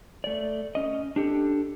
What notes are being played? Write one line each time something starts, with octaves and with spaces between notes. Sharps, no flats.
A3 D5
C#4 D#5
D4 G4 A4